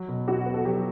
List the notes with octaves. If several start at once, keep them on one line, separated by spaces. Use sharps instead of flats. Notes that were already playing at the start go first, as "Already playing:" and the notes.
Already playing: F#3
B2
E4 F#4
B3
A4
F#3 G4